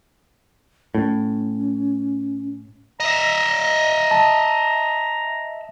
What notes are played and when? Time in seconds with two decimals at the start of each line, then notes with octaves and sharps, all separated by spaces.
0.95 A2 C#4
3.00 D#5 E5 A#5
4.11 A5